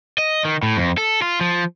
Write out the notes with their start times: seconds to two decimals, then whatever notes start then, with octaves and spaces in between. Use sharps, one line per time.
0.18 D#5
0.45 D#3
0.63 A2
0.77 F2
0.98 A4
1.22 F4
1.41 F3